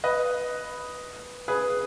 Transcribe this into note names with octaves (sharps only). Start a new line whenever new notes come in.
B4 D#5
G#4 B4